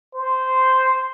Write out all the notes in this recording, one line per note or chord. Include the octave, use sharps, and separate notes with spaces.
C5